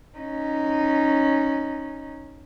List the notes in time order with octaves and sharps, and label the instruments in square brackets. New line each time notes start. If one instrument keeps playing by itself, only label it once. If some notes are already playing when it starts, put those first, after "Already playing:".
[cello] C#4 D#4